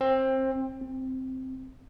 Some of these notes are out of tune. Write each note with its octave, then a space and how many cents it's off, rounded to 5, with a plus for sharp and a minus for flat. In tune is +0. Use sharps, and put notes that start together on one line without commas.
C4 +20
C4 -5